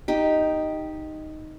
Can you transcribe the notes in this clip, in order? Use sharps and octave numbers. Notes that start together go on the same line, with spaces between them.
D#4 G4